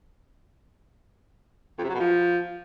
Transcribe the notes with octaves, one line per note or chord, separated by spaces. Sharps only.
F2
C3
F#3
B2
F3